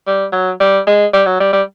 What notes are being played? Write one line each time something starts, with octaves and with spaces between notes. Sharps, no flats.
G3
F#3
G3
G#3
G3
F#3
G3
G3